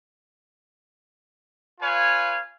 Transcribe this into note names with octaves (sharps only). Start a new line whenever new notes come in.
F4 B4 C#5 F5 G#5